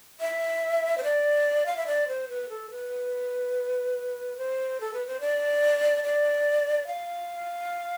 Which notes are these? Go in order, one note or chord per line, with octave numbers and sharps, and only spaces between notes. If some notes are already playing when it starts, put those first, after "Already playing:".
E5
C5
D5
F5
E5
D5
C5
B4
A4
B4
C5
A4
B4
C5
D5
D5
F5